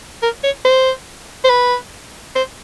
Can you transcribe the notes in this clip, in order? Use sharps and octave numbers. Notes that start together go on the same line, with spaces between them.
A#4
C#5
C5
C5
B4
C5